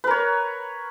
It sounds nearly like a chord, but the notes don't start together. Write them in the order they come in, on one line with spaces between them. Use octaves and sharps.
B4 A#4 C#5